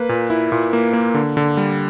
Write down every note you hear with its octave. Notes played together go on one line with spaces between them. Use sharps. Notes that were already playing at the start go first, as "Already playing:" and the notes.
Already playing: A#3 B4
A#2
E4
A#2
A#3
A#3
D3
D3
G3